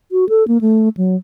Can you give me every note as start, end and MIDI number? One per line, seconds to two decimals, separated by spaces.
0.12 0.28 66
0.29 0.46 69
0.48 0.61 58
0.61 0.89 57
0.97 1.16 54